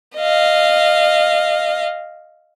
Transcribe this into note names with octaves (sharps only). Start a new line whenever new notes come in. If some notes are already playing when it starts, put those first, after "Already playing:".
D#5 F5